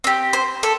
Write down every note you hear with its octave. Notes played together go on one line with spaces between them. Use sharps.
C4 G4
C5
A4